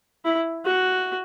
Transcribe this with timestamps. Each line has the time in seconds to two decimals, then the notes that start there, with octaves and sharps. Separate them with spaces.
0.25 E4
0.65 F#4